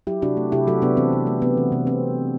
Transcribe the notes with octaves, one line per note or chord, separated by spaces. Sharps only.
F#3 E4 G4
C3 D4 F#4
A3
C3 E4 G4
F#3 F#4 A4
C3 B3 D4
E3 C4
C3
A3
C3 B3
E3
C3
C4